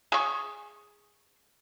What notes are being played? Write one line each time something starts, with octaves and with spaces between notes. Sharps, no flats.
G#4 C#6